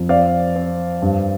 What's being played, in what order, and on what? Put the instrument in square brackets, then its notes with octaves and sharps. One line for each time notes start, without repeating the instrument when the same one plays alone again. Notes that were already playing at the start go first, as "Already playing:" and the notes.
Already playing: [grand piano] F2
C4 D5 F5
C4
G2